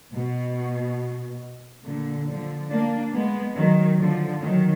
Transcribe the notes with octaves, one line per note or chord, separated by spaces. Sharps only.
B2
A#2 D3
D3 F3
A#3 D4
G#3 B3
D#3 F#3
D3 F3
D#3 F#3